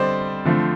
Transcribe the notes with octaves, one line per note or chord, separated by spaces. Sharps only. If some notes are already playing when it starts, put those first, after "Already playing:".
Already playing: D3 G3 C4 C5 D5 D#5
D3 F3 A3 C4